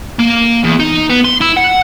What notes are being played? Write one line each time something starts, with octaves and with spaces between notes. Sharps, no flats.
A#3
E2
D#4
B3
C6
E4
F#5